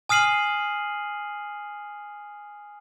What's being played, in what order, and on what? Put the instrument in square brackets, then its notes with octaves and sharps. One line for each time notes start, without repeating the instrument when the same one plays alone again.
[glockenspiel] G#5 D#6 F6 C7 D#7 F#7